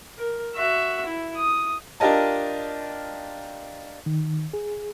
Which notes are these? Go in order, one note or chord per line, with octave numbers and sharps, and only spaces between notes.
A#4
F#4 E5
E4
D#6
D4 F4 G4 A#4 D#5 A5
D#3
G#4